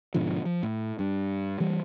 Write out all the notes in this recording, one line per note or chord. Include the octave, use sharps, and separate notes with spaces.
G#2 B2 D3 F3
F3
A2
G2
E3 G3